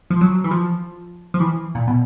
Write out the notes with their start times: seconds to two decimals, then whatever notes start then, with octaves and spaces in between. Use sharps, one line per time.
0.10 F3
0.21 F#3
0.44 E3
0.51 F3
1.34 F3
1.40 E3
1.75 A#2
1.88 B2